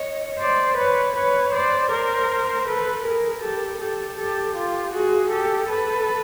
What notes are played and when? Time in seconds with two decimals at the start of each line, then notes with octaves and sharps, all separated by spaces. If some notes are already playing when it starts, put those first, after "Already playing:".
Already playing: C#5 D#5
0.40 C5 D5
0.77 B4 C#5
1.16 B4 C#5
1.53 C5 D5
1.91 A#4 C5
2.67 A4 B4
3.05 G#4 A#4
3.42 G4 A4
3.80 G4 A4
4.18 G4 A4
4.55 F4 G4
4.93 F#4 G#4
5.31 G4 A4
5.69 A4 B4